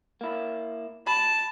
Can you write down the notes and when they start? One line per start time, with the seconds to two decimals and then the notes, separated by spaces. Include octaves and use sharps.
0.21 A#3 E4
1.07 A5 B5